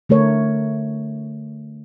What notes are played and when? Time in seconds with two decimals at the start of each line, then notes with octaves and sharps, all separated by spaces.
0.09 D3 A3 A#4 C#5